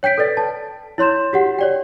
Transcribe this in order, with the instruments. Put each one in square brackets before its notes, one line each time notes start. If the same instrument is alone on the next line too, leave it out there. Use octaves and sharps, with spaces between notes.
[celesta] C#5 G5 G6 B6 D7
A4 B4 D5 A6
A5
E4 C#5 C6 G6 E7
F#4 G4 F#5
C#5 D5 G5